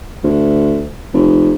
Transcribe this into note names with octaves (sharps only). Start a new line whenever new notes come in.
D2
F1